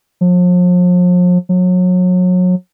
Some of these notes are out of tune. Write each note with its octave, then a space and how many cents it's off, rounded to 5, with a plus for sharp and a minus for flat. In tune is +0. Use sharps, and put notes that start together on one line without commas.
F3 +40
F#3 -30